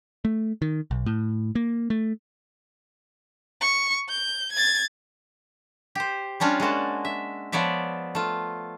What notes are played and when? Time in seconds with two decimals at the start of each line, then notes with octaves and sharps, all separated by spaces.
0.25 A3
0.62 D#3
0.91 B1
1.06 A2
1.55 A#3
1.90 A3
3.61 C#6
4.09 G6
4.53 G#6 A6
5.95 G4 C5
6.40 G3 C#4 D4 F4 C#5
6.60 G#3 A#3 F#4 A5
7.05 E5
7.52 F3 B3 C#5 D5 E5
8.15 A3 F4